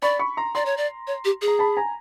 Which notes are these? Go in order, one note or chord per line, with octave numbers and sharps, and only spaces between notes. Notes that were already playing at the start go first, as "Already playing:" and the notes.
D5 B5 C#6
B5 C#6
A#5 C6
D5 A#5 C6
C#5
D5
C#5
G4
G#4
A#5
A5 B5
G#5 A#5